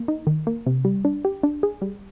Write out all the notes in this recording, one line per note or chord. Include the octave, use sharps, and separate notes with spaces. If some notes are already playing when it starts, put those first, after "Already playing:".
Already playing: A#3
D#4
D#3
A#3
C3
G3
D4
G4
D4
G#4
G3